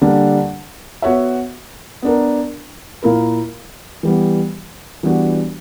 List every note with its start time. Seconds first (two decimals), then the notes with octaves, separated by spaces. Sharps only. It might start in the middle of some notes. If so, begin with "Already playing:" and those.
0.02 D3 G3 A#3 D4
1.02 B3 F#4 C#5 E5
2.02 B3 D4 A#4
3.03 A#2 A#3 E4 A#4
4.03 E3 G3 B3
5.03 E3 G3 B3 D4 F#4